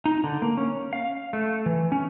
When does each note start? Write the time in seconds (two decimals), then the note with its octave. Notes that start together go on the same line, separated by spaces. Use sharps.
0.05 D#4
0.24 D3
0.42 A#3
0.57 C#4
0.93 F5
1.33 A3
1.66 E3
1.92 C#4